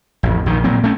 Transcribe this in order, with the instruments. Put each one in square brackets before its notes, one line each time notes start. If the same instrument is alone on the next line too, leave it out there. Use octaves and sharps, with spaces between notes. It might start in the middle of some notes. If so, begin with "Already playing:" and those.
[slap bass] A1 F2
A#1 D#3
A#2 F#3 C4
A3 C4 C#4